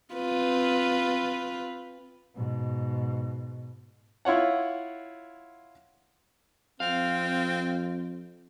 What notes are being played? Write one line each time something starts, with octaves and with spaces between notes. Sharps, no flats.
C4 F4 B4
G#2 B2
E4 F4 C#5 F#5
F2 C4 F5